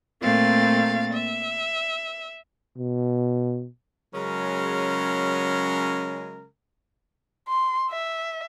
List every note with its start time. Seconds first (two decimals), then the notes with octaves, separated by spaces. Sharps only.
0.23 A#2 A3 A#3 C4 F5 A6
1.13 E5
2.78 B2
4.13 C#3 F#3 G#3 C#4 A#4
7.48 C6
7.91 E5